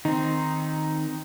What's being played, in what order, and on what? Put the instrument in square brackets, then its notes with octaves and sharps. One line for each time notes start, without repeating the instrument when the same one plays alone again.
[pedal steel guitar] D#3 C4 [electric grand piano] D#4